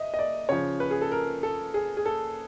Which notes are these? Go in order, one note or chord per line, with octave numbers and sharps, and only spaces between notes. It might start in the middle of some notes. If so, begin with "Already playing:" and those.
Already playing: D#5 E5
D#5
D5
C#3 F3 C#5
B4
G#4
A4
A#4
A4
G#4
G#4
A4